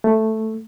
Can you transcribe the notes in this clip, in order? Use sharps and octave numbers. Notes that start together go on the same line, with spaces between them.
A3